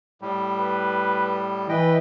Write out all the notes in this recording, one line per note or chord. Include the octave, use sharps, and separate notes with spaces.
A2 G3
B4
E3 B4 D#5 G5